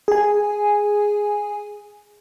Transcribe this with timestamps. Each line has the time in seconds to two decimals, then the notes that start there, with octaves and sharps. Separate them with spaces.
0.08 G#4 G#5